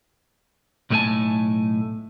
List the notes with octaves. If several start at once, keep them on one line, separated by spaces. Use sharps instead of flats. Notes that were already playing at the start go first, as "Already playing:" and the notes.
B1 A2 A3 A#4 G#5 A5